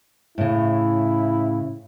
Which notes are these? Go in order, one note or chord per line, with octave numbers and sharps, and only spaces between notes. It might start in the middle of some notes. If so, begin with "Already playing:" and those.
A2 C#3 E4